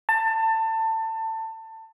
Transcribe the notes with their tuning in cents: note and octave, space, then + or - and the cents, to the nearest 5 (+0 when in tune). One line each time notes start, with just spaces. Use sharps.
A5 +25